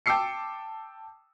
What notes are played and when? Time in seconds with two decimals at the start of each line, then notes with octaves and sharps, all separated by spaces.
0.06 G5 A5 D6 E6 C7 C#7